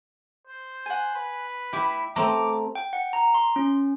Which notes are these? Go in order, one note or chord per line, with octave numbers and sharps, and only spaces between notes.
C5
F#5 G#5
B4
E4 G4
A3 C4 A#5 D6
G5
F#5
A#5
C6
C#4